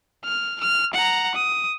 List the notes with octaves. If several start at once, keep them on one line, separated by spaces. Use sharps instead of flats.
F6
F6
F#5 A#5
D#6